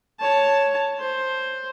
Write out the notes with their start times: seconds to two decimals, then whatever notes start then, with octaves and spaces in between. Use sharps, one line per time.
0.20 C#5 A5
0.99 C5